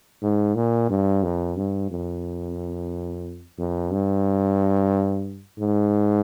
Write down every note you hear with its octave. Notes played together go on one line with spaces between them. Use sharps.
G#2
A#2
G2
F2
G2
F2
F2
G2
G#2